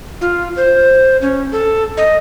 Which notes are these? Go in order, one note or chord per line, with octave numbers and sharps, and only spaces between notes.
F4
C5
C#4
A4
D#5